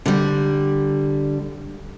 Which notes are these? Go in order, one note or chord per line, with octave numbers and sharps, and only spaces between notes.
D3 G3